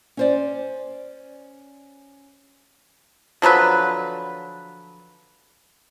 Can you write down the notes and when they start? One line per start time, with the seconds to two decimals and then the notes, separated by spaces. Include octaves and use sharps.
0.17 C#4 C5 D5
3.42 D3 F3 F#3 B4